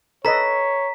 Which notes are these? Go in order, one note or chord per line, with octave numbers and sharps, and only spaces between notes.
A4 B4 C#5 D#5 A#5 B6